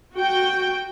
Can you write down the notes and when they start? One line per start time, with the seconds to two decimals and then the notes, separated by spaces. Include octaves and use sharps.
0.14 F#4 G5